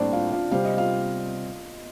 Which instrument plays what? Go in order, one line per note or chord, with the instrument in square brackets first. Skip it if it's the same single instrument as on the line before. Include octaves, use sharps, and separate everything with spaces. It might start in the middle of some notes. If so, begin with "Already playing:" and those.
Already playing: [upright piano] A2 G3 A#3 [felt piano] C4 D4 C5 D5
[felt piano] F4 F5
F4 F5
[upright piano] C3 G3 C4 [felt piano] F5
[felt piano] D#5
F4 F5